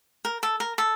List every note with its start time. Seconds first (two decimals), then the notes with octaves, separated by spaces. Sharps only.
0.25 A#4
0.43 A4
0.60 A#4
0.78 A4